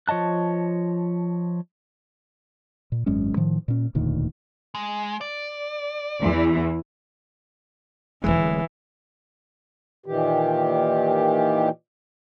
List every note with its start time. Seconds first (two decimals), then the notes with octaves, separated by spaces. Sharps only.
0.08 F3 C#5 D#5 A5 F#6
2.92 A#2
3.06 G#1 F#2 G#3 C#4
3.36 A2 D#3 F3
3.68 A#2 C#4
3.95 E1 D2 A#2 D#3
4.75 G#3
5.21 D5
6.21 E2 E3
8.24 D1 B1 E3 G#3
10.06 A#2 D#3 E3 G4